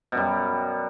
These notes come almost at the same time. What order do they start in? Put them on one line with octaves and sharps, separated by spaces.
B2 F#2 G3